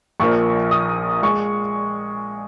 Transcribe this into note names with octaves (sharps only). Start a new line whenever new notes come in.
A#1 A#2 F3 A#3 C#6
D#6
G#3 C#6